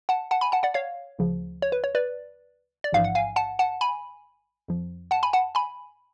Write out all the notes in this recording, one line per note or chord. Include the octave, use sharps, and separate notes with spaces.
F#5 A5
F#5 A5
G#5 B5
F#5 A5
D5 F#5
C#5 F5
D2 C#3 F3
C#5
B4
C#5
B4 D5
D5
A1 G#2 F3 F5
F#5
F5 G#5
F#5 A5
F#5 A5
G#5 B5
F2 F3
F#5 A5
G#5 B5
F#5 A5
G#5 B5